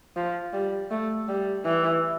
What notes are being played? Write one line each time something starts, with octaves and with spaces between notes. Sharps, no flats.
F3
G3
A3
G3
E3